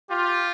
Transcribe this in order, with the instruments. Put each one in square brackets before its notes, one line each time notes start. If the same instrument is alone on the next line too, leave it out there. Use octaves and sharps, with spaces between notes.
[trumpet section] F4 [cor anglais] G4